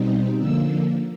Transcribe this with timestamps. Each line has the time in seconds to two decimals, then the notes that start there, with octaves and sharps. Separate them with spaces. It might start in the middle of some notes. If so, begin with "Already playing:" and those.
Already playing: B2 G3 C4 D#4
0.37 D3 F3 A#3 E6